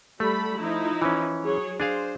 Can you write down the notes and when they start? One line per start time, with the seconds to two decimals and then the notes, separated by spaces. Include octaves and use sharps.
0.20 G3 A3 A4 B5
0.58 F3 D#4 E4
1.02 E3 C#4
1.44 F#3 G#4 C#5
1.80 D4 G#4 C5 F5